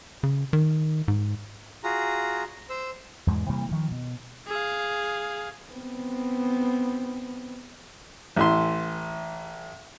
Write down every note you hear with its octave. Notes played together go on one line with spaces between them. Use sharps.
C#3
D#3
G#2
F4 F#4 G#4 A#5
C5 E6
E2 G#2 B2 G#3
C3 E3 G3 A#3
D#3 F3
B2
G#4 F5
B3 C4
A1 E3 E5 C6